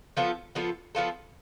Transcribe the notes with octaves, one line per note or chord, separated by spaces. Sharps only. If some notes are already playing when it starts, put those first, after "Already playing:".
F3 B3 F4 A4
F3 B3 F4 A4
F3 B3 F4 A4